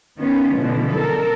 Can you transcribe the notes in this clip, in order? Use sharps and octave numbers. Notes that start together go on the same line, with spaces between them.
D#3 B3 C#4 F4
B2 D3 E3 F3
A4 A#4